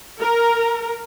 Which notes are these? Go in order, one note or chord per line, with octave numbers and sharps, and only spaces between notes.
A#4